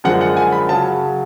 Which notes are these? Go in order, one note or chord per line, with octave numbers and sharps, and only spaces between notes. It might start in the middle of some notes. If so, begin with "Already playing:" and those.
F#2 D3 F3 G#3 F#5
F#5
G#5
B5
C#3 F#3 A5